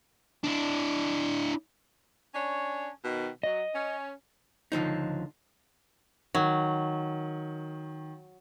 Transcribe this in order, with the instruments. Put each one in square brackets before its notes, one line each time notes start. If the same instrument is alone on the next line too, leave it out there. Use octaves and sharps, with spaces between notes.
[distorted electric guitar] D4 E4
[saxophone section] C#4 D4 C#5
B2 D#3
[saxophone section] F#3 [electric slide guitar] D#5
[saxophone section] C#4
[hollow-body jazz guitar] C#2 D3 F3 D#4
[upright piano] D#3 [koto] F#3